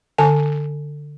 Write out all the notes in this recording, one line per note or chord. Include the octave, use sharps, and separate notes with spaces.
D3 G#5